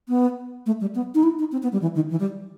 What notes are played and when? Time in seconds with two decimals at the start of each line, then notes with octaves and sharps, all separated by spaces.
0.09 B3
0.66 A3
0.81 G3
0.95 B3
1.15 D#4
1.23 E4
1.39 D#4
1.52 C4
1.63 B3
1.72 G3
1.82 E3
1.95 D#3
2.11 E3
2.20 G3